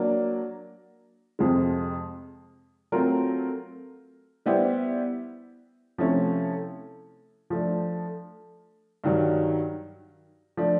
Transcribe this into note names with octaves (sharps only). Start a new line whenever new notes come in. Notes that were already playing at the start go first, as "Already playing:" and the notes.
Already playing: F#3 A#3 D4
F2 C3 F3 G#3
F#3 A3 C4 F4 A#4
G3 B3 E4 G4 C5
C3 F3 A3 C#4 E4
F3 A3 D4
G2 D#3 F#3
F3 A3 D4